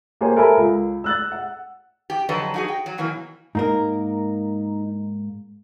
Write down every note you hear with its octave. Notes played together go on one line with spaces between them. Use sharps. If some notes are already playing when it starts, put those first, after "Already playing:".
A#3 G4 C5 C#5 G#5
A4 A#4 E5 G#5 B5
C#2
E6 F#6 A6
F#5
G4
F2 D3 F#3 A4 B4 D#5
D#4 F#4 G#4
G5
F#3
B2 E3 F#3 A#3
G#2 A#3 D#4 A#4